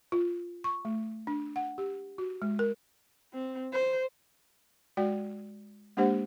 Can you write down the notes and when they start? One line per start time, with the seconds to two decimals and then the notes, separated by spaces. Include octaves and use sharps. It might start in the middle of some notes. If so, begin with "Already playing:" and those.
0.12 F4
0.64 C#6
0.85 A3
1.27 D4
1.56 F#5
1.78 G4
2.18 F#4
2.42 G#3
2.59 A#4
3.33 C4
3.73 C5
4.97 G#3 F#4 D5 G5
5.97 G#3 A#3 D4 G4 C5 F#5